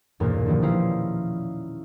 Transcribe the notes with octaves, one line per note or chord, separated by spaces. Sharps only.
B1 E2 G2 A#2 A#3
D3 D#3 F3 G3 B3
C#4 D#4 E4 F5 A#5 C6